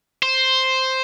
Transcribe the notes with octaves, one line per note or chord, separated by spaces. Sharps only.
C5